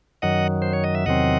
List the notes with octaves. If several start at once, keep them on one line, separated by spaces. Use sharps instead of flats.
F#2 D#3 F#3 D#5 F#5
C5
C#5
D#5
E5
E2 C3 D#3 F#3 C4 D#5 F#5